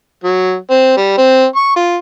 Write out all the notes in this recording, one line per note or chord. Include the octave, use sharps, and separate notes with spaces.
F#3
C4
G3
C4
C#6
F4